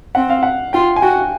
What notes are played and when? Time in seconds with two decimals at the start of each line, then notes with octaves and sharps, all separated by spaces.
0.15 C4 F#5
0.30 F5
0.43 F#5
0.73 F4 G5
0.96 G#5
1.02 F#4 G5